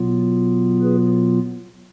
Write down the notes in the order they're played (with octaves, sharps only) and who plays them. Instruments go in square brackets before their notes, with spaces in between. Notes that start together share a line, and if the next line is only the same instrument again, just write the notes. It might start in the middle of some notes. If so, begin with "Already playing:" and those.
Already playing: [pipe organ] B2 F#3 B3 F4
G#4 B4